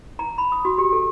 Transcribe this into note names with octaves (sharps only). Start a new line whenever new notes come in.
A#5
B5
D#6
F#4
G4
A4